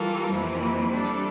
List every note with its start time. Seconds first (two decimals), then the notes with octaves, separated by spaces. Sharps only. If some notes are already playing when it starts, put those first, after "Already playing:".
Already playing: E3 G3 A#3 F4 A4
0.32 F2 C3 E3 A#3 E4
0.91 C3 G3 D4 A4